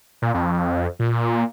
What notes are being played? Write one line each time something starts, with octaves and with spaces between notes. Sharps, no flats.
A#2
F2
A#2